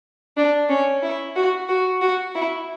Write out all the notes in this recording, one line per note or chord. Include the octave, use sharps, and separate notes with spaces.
D4
C#4
E4
F#4
F#4
F#4
E4